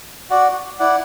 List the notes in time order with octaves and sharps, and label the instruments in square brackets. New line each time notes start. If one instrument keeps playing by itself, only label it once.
[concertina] F#4 D5 F#5
E4 D5 F#5